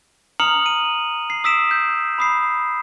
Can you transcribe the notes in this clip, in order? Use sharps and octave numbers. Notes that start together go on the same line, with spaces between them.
A#5 D#6 F6 C#7 F7 F#7
D#7
C7
D#6 E6 B6 D7 E7
G6
B5 D#6 C7